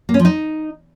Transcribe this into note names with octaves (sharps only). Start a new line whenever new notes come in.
A#3
C#4
F3
D#4